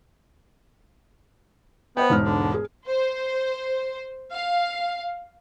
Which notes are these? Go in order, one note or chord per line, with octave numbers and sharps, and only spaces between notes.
B3 C5 D#5 G5
E1 G#2 F6
D3
G#4
C5
F5